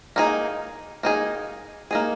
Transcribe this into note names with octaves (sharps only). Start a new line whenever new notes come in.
A#3 D#4 G#4
A#3 D#4 G#4
A#3 D#4 G#4